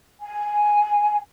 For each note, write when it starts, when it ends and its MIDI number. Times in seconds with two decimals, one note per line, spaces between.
0.20 1.16 80